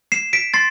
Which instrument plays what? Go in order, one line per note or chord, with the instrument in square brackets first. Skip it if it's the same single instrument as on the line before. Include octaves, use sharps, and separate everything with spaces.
[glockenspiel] C7 E7
B6 D7
C6 A6 C7